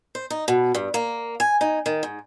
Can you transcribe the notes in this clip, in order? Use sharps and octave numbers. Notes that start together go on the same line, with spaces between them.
C5
D#4
B2
G2
A#3
G#5
D#4
D#3
G#2